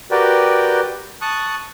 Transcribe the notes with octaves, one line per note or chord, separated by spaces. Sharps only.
F#4 G4 A#4 B4 D5 G5
A5 C#6 D#6 F#6